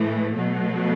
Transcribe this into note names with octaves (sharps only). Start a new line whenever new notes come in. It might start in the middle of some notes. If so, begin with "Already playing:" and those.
Already playing: A2 E3 A3
B2 F#3 A3